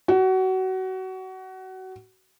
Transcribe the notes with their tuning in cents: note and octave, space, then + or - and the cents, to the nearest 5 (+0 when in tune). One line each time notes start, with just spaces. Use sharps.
F#4 +25